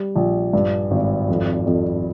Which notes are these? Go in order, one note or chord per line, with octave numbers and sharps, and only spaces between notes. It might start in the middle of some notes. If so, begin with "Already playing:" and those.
Already playing: G3
A#1
G2
G#1
F2
F2